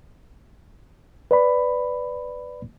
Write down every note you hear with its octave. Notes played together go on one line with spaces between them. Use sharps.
B4 D5 B5